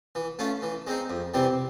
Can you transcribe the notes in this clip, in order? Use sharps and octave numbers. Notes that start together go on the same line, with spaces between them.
E3
A3 C#4 F4
E3
G#3 C4 D#4
F2
C3 E3 G3 C4